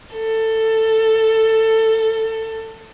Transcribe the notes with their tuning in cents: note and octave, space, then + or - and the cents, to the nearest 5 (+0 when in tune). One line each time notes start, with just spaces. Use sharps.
A4 +15